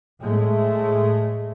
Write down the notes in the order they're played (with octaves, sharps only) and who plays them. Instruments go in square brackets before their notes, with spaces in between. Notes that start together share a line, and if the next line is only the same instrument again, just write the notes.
[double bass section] A2 G#3 A3